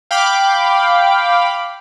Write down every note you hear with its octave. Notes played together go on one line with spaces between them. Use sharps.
F5 G5 B5 D6